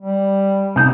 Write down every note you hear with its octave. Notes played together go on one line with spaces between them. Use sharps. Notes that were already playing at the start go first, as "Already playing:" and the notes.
G3
C3 B3 D#4